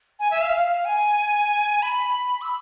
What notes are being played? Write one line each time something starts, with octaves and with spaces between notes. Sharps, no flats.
G#5
E5
F5
F5
G#5
B5
E6